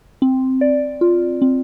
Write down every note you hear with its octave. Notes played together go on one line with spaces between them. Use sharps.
C4
D5
F4
C4